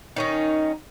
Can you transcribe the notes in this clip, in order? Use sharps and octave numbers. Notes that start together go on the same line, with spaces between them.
D#3 C#4 D#4